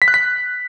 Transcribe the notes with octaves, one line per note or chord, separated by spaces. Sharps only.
B6
F#6
B6